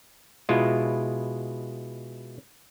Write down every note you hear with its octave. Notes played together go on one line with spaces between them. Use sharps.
B2 G#3 E4 F4